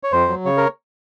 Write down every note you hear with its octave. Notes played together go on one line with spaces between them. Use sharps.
C#5
F2 C5
F#3
C#3 C#5
A#4